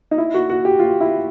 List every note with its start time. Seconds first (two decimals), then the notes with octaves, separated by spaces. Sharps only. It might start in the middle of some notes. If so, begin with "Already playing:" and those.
0.11 D#4
0.18 E4
0.34 F#4
0.50 F#4
0.65 G4
0.79 F4
1.00 E4